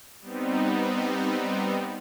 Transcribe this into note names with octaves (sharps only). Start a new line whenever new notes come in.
G3 B3 C4 D#4